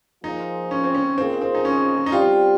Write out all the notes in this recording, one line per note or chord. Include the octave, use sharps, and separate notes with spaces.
F3 A#3 D#4 F4 G#4 C5
C#4
C4
C#4
D#3 A#3 C4 F4 G#4 C5
C4
D#4
C#4
D#4
G3 C4 F4 G4